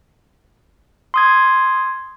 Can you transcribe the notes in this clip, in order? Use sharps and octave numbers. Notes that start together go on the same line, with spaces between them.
C6 D#6 G#6